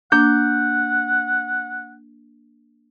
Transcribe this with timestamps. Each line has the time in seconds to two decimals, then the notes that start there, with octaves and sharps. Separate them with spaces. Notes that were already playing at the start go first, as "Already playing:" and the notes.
0.12 A#3 D4 F#5 G6